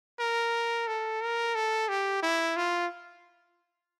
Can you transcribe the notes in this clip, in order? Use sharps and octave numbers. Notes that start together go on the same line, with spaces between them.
A#4
A4
A#4
A4
G4
E4
F4